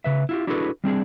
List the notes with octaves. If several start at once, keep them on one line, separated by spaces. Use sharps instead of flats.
C#3 B4 E5
E4 F4 G4
D4 E4 F#4 G#4 A4 B4
G3 C4 D4 G#4